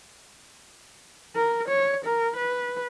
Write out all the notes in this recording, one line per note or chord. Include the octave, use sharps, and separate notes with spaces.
A#4
C#5
A#4
B4